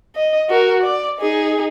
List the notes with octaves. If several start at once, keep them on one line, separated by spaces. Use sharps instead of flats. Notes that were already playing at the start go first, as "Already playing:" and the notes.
D#5
F#4 A#4
D5
D#4 G#4